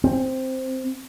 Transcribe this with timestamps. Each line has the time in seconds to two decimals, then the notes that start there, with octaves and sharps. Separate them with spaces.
0.04 C4